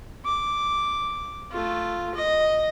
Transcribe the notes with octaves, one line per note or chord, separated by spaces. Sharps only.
D6
A3 F4
D#5